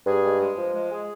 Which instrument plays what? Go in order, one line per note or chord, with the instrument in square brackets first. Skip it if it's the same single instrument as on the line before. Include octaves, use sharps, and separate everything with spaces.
[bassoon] G2 [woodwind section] G#4
[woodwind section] G#3
G#3
F3
G#3
G#4